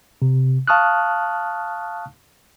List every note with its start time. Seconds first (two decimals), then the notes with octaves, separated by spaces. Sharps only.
0.22 C3
0.68 F5 A5 C#6 D#6 F6 F#6